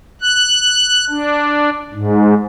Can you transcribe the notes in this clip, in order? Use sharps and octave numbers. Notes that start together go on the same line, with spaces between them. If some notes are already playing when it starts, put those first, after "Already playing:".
F#6
D4
G#2